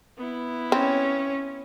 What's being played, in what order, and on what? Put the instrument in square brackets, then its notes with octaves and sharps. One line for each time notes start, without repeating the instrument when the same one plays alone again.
[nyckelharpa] B3 E4
[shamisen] C4 [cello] C#4